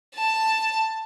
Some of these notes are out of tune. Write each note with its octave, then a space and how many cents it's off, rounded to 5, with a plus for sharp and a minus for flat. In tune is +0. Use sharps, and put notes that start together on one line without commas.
A5 +10